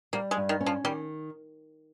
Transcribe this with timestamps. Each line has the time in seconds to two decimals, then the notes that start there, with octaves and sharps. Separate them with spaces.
0.13 G3 A#3
0.31 G#3
0.37 G2
0.49 D#3
0.61 C#4
0.66 F3
0.84 D#3 G3